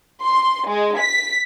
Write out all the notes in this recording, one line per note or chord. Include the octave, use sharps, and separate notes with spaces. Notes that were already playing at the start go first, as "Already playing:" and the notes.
C6
G#3
B6